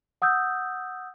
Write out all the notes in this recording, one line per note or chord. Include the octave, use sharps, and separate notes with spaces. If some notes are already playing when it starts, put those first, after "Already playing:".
F#5 D#6 E6 G6